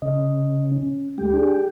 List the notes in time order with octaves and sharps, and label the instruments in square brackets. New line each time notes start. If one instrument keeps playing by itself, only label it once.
[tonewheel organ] C#3 [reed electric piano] D#5
[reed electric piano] C#4
[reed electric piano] D2 G#3 A3 [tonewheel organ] G4
[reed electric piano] D4 G#4